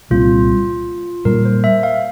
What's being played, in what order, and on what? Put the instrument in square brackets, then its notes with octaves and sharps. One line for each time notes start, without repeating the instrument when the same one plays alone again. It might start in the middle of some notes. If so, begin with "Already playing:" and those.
[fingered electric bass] C2 A#2 G3 C4 [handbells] F4
[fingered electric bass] A#2 G3 A#3 [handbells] A#4
[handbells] C5
E5
F5